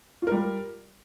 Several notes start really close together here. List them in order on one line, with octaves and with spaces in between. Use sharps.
F4 A#4 G3